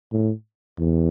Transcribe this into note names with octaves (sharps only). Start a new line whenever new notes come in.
A2
E2